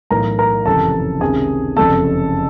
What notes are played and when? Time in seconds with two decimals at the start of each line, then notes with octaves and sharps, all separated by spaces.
0.10 B1 A2 E3 A#4 A#5
0.39 A#4 A#5
0.66 F#1 F2 C3 E3 A4 A5
1.21 C#2 C3 D#3 G#4 G#5
1.76 F#1 F2 C3 A4 A5